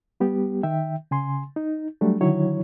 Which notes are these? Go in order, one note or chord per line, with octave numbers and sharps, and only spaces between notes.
G3 B3 G4
D#3 E5 G5
C#3 G#5 C6
D#4
F#3 G3 A3 D4
D3 D#3 F#3 E4 C#5